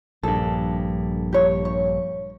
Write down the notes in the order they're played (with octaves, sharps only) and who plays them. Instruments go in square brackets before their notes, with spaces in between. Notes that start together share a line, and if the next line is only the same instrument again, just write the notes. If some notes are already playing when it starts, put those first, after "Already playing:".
[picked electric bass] A#1 G2 [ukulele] A4
[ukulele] G4 C#5
C#5